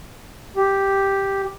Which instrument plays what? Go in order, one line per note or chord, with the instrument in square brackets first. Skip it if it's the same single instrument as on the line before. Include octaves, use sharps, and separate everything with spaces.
[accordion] G4